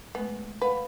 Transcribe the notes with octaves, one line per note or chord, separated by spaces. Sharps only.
G#3 A3 B3
B4 F5 F#5